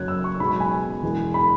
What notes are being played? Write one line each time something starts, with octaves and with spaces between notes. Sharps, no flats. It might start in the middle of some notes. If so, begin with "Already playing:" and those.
Already playing: F#1 F#2 F#3 F#6 G#6
E6
C#6
B1 B2 G#3 B5
B5
G#5
E1 E2 E3 G#3
B5